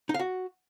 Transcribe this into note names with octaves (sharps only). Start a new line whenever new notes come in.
D#4
F5
F#4